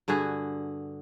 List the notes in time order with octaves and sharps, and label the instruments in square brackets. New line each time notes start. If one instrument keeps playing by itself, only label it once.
[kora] G2 D3 F#4 G#4